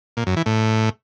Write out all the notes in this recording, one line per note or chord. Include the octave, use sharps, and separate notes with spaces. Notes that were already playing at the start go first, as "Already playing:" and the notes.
A#2
F#2
E3
A2